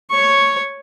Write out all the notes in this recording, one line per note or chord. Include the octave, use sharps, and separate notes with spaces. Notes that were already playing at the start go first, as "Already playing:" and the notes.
C#5 C#6